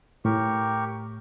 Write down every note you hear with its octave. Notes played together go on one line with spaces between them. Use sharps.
A2 G4 A#4 C#6